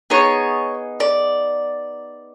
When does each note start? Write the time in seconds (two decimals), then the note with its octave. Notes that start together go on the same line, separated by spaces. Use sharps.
0.10 B3 D#4 G#4 C#5
1.00 D5